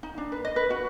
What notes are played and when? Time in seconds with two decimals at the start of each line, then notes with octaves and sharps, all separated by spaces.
0.03 D#4
0.18 D4
0.32 B4
0.45 D#5
0.56 B4
0.70 F#4